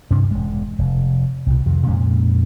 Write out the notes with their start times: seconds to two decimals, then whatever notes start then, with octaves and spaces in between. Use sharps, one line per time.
0.11 G2 C3 C#4 D4
0.31 E1 G#3
0.78 F1
1.46 C2 B2
1.66 F2 C3 D#3
1.87 F2 A#2 G#3 C#4